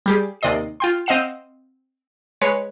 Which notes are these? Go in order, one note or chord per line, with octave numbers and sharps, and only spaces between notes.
G3 G4 G#4
D#2 C3 D5 D#5 C7 D#7
F4 G5 C6
C4 D#5 F5 F#5 C7 E7
G#3 B4 C#5